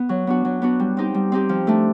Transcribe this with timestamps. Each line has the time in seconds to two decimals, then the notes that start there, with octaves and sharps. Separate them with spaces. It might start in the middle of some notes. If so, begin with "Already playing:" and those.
Already playing: B3
0.09 F#3
0.27 B3 D4 F#4
0.45 F#3
0.62 B3 D4 F#4
0.80 G3
0.97 C4 D#4 G4
1.14 G3
1.32 C4 D#4 G4
1.49 F3
1.67 A3 D4